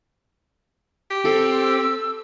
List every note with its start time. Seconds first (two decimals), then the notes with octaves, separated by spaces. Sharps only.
1.11 G4
1.25 C4 A4 E6